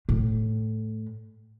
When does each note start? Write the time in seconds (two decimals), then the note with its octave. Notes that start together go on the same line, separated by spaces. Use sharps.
0.09 A2